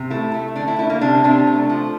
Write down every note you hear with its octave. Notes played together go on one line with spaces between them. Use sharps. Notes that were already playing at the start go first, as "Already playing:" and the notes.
Already playing: C3
A3 E4
A3
D3 D4
E4
A3 E4
A#3
C3 D4
C3 D4
A3
F3